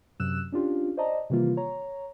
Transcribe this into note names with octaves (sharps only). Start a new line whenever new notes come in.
F#2 C3 F#3 E6 F#6 E7
C#4 D4 F4 G4
C5 D5 D#5 A5 A#5
C3 D#3 E3 G3 A#3 F4
C#5 A#5